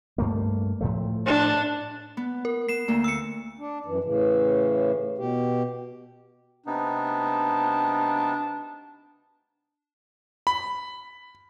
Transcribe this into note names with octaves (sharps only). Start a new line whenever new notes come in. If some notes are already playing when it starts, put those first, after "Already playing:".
G2 A3 A#3
A2 F3 A3
D4
B3
A#4
B3 C7 E7
D2 A#3
E6 C#7
D4
F#2 E3
A2 C#3 E3
B2 G4
C3 B3 D4 D#4
B5